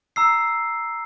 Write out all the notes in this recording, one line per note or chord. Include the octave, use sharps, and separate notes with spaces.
A#5 E6 C7